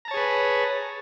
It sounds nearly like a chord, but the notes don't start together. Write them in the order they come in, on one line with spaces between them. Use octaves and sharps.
A#5 A5 C#5 G#4 B4